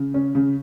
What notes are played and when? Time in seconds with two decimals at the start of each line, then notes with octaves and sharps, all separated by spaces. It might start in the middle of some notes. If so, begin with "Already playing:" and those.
Already playing: C#3
0.14 C#4
0.35 C#3